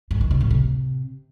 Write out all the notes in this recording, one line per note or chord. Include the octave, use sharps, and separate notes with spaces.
G#2
D#3
C3
A2
C3